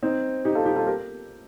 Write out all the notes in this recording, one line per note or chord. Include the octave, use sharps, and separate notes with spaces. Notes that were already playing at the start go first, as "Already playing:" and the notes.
C4 D#4
D#4 G4
F4 A4
D#4 G4
F4 A4
G4 A#4